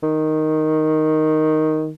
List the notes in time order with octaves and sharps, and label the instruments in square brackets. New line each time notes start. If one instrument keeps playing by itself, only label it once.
[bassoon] D#3